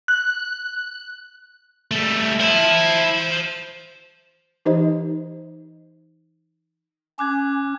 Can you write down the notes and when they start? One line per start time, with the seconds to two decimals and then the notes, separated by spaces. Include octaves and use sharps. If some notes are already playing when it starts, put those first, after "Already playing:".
0.08 F#6
1.91 G3 A3
2.41 E4 C5 A5
4.66 E3 D#4 G4 C5 D#5
7.19 C#4 D6 F#6 G#6